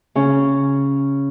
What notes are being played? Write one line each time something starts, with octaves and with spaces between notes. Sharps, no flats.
C#3 C#4